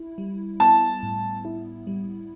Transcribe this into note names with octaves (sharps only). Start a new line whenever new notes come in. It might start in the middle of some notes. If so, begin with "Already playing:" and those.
Already playing: E4
G3
B3 A5
A2
E4
G3